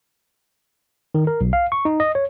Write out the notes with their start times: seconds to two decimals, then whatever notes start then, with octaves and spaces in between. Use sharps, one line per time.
1.15 D#3
1.27 A#4
1.41 B1
1.53 F5
1.72 C#6
1.85 D#4
2.00 D#5
2.15 C#5